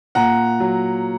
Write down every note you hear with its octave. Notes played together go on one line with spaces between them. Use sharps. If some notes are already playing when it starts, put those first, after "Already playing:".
A#2 F#5 A#5
F#3